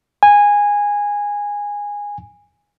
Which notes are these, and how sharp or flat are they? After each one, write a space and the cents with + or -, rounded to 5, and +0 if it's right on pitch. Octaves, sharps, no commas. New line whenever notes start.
G#5 -15